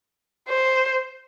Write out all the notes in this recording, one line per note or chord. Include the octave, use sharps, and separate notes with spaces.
C5